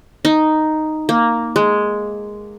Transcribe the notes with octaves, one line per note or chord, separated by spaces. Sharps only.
D#4
A#3
G#3